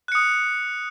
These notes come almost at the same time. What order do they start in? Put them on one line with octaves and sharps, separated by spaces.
F#6 C#7 D#6